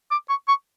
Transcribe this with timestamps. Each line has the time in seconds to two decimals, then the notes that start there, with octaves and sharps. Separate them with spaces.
0.11 D6
0.29 C#6
0.48 C#6